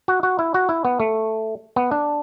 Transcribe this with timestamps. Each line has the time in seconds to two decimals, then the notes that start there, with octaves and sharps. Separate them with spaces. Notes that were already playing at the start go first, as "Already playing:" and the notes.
0.08 F#4
0.23 F#4
0.39 E4
0.54 F#4
0.69 E4
0.85 B3
1.00 A3
1.76 B3
1.91 D4